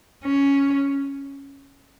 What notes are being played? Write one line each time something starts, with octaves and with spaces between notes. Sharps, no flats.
C#4